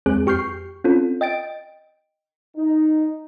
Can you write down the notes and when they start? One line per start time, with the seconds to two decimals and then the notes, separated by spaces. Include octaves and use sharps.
0.06 E2 G#3 C4 G#4 F#6
0.26 F2 G4 C#6 F6 G6 C7
0.84 C4 C#4 F4 A4
1.21 D#5 G5 A6 D7
2.57 D#4